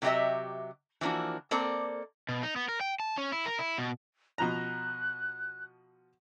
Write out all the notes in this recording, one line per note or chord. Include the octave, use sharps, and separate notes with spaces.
C3 F#3 E4 G4 D#5 E5
E3 F3 A#3 D4 F#4
A#3 C4 A4 D5
B2
D#4
B3
A#4
G5
A5
C#4
E4
A#4
E4
B2
B2 F3 A#5 F#6